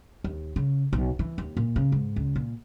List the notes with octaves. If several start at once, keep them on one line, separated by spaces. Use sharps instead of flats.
D#2
C#3
B1
E3
D#2
A#2
C#3
G#2
C#2
A#2